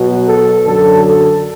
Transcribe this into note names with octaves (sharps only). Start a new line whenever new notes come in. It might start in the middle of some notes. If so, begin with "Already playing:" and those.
Already playing: B2 F#3
A4
F#2 D3 F#3 A4
A4